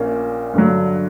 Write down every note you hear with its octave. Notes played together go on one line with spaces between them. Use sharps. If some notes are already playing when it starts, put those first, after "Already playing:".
Already playing: A#1 A#2 A#3 C#4
G2 D3 F#3